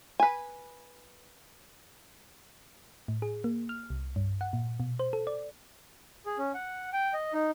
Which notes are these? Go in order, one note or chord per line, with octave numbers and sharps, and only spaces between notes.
B4 G#5
A2
G#4
A#3
F6
C2
G2
F#5
A#2
B2
C5
A4
D5
G#4
C#4
F#5
G5
D#5
D#4